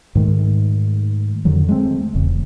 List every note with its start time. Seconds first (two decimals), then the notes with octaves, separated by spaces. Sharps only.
0.15 G#2 D#3 G#3 A3
1.45 F2 D3 D#3 F#3
1.69 G#3 A3 B3 C4
2.14 D#1 E2 C#3